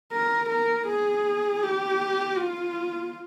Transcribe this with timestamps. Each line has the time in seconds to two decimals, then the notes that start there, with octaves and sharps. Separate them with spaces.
0.12 A#4
0.50 A#4
0.87 G#4
1.63 G4
2.38 F4